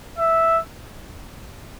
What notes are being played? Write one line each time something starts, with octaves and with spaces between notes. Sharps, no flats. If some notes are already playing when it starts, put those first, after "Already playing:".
E5